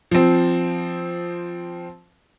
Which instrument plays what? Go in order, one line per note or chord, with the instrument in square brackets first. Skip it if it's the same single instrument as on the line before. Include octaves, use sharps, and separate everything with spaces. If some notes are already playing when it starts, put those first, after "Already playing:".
[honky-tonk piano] F3 C4